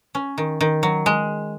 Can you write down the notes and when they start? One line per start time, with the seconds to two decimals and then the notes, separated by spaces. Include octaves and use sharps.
0.15 C#4
0.38 D#3
0.61 D#3
0.83 F#3
1.06 G#3